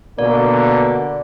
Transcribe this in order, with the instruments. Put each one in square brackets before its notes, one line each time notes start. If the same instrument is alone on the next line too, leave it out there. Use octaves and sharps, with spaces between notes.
[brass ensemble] B2 D3 [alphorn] A#3 [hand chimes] D5